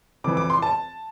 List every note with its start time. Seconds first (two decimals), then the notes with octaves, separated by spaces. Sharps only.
0.24 F2 E3 D6
0.37 D6
0.50 C6
0.62 A5